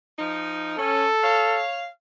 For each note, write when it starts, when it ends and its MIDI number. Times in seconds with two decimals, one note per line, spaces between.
0.18 0.74 53
0.18 0.74 63
0.79 1.07 61
0.79 1.64 69
1.24 1.87 73
1.24 1.87 77